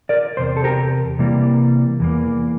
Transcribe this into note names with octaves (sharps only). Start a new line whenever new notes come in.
A#4 D5
E2 C3 C5
A4
G4 A#4
C3 E3 G3 A#3
E2 E3 A#3